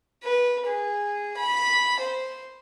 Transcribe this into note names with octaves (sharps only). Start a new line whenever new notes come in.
B4
G#4
B5
C5